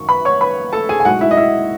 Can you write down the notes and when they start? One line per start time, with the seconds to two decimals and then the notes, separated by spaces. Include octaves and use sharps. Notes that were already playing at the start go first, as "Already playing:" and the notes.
Already playing: G#1 F#2 C#6
0.09 B4 B5
0.25 C#5 C#6
0.41 B4 B5
0.73 A4 A5
0.89 G#4 G#5
1.00 G#5
1.05 B1 A2 G#3 F#4 F#5
1.21 E4 E5
1.31 D#5
1.37 E4 E5